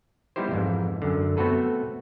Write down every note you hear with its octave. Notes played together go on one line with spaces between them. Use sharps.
G3 B3 D#4 E4 G4 C5
F2 G#2 E3
F#2 D3
A3 B3 C4 F#4 A4 B4